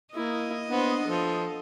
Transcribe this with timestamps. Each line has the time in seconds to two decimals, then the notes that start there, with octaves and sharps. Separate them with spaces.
0.14 A#3 E4 D#5
0.68 B3 D4 C5
1.06 F3 A4